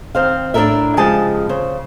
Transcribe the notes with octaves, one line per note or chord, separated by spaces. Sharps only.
D#3 C4 C5 F5
A2 D4 E4 A4 A#4 E5
C#3 F3 G#3 G4 G#5 A5
C#3 C5